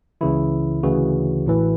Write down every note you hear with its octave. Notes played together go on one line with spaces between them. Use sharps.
C#2 C#3 E3 E4
D2 C#3 E3 F#4
A1 A2 E3